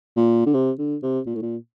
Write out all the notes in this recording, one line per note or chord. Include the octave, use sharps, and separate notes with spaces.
A#2
D3
C3
D3
C3
A#2
A2
A#2